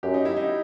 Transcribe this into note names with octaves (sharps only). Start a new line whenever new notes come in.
F#2 G4
D#4
E4
D#4